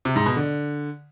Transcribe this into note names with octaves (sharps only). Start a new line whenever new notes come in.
C3
G#2
B2
D3